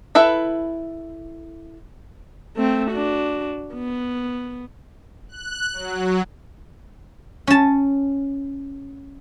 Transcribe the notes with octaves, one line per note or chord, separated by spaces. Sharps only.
E4 A4 B4 E5
A3 C4
D4 F#4
B3
F#6
F#3
C#4 A5